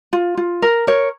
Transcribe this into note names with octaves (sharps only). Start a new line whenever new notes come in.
F4
F4
A#4
A#4 C#5